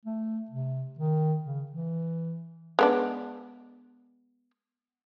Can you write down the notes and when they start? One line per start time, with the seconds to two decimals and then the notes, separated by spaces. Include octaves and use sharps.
0.05 A3
0.51 C3
0.99 D#3
1.44 C#3
1.71 E3
2.79 G#3 B3 D4